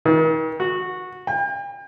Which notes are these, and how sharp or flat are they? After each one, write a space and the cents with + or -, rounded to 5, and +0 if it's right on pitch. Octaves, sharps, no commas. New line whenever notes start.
D#3 +45
F#4 -15
G5 +40